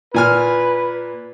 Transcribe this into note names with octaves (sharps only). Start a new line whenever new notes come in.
A#2 B4 G#5 F6